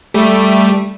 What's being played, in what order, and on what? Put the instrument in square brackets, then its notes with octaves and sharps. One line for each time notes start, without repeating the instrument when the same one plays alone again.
[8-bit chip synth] G3 A3